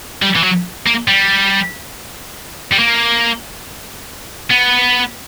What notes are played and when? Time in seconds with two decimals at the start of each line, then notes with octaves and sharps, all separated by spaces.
0.22 G3
0.36 E3
0.44 F#3
0.87 A#3
1.08 G3
2.73 G3
2.79 A#3
4.50 B3